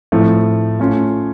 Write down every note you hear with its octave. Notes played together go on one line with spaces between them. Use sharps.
A2 F3 A3 C4
A3 C#4 F4